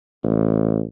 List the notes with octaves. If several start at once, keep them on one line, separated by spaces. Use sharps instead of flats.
A1